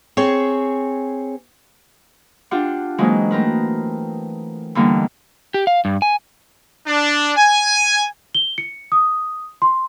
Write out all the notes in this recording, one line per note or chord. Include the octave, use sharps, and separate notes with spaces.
C4 G#4 C#5
D4 F4 G4 F#5
E3 F#3 G#3 A#3 C4 D#4
A3 C4 A#4 B4
D3 E3 G3 A#3 B3 D#4
G4
F5
G2
G#5
D4
G#5
G7
C#7
D#6
C6